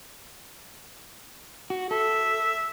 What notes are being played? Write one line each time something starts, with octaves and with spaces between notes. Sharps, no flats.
F#4
A4 E5